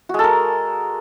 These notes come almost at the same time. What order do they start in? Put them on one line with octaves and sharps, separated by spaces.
F#4 G#3 A4 A#4